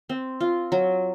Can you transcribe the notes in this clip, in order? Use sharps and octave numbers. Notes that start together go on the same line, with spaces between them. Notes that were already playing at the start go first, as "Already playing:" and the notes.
C4
F4
F#3